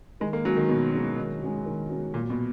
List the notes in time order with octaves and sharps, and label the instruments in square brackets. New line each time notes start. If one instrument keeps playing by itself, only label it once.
[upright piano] D#3 [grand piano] G#3
[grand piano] A#3
[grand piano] F#3 [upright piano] G#3 C#4 F#4
[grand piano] D#3
[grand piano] B2 [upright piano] D#3
[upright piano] G#3 C#4 F#4
D#3
G#3 C#4 F#4
D#3
G#3 C#4 F#4
[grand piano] A#2 [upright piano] F#3
[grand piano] B2